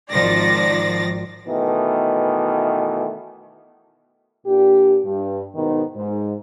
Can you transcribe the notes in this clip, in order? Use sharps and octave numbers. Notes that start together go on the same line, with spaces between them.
G#1 D#3 F3 D5 A6 A#6
B2 D#3 E3 A3 B3
A#2 D4 G4
G2
G#2 B2 D#3 B3 D#4
G#2